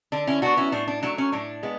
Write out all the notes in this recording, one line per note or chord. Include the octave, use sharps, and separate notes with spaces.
D3 D4
C#4 E4
F#3 B3 D4 F#4
C#4 E4
A2 D4
D4
F#3 A3 D4
C#4
A2 D4
G#3 B3